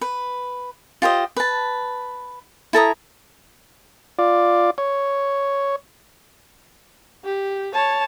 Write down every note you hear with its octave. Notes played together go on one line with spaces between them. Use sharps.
B4
F4 G4 C5 D#5
B4 A5
E4 A4 A#5 D#6
F4 D5
C#5
G4
C#5 A5